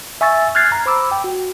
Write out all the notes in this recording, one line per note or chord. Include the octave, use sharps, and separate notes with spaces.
E5 G#5 C#6 E6 A6
F6 F#6 G#6 A6 C7
A#5
C5 B5 D6 E6
G5
F#4